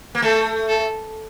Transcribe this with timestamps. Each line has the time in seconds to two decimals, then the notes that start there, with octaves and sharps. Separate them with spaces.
0.15 A#3
0.22 A3 A4
0.68 A4